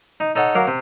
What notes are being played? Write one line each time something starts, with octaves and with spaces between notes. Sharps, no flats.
D#4
D#4 A4 C#5 F#5
F#3 A#4 F5 D6
C3